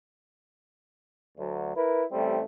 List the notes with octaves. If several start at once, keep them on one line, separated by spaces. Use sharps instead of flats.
D2 F#3
E4 A#4 B4
A1 G3 A3 C4